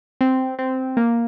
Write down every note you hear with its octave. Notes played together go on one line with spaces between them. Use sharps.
C4
C4
A#3